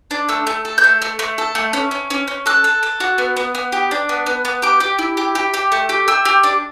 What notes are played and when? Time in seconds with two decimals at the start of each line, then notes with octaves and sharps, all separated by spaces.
0.11 D4
0.29 A3 E6
0.47 A3
0.65 A4
0.78 G6
0.84 A3
1.02 A3
1.19 A3
1.38 A4
1.55 A3
1.73 C#4
1.91 C#4
2.10 C#4
2.28 C#4
2.46 A4 F#6
2.64 A4
2.83 A4
3.00 F#4
3.18 B3
3.37 B3
3.55 B3
3.72 G4
3.91 D4
4.09 B3
4.26 B3
4.45 B3
4.62 G4 D6
4.80 G4
4.99 E4
5.17 G4
5.35 G4
5.54 G4
5.72 A3
5.89 G4
6.08 G4 E6
6.25 G4
6.44 D4